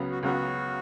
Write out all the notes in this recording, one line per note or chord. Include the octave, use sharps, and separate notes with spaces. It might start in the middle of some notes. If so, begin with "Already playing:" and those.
Already playing: C#2 C#3 F#3 B3
F#4
C#2 C#3 F#3 B3 F#4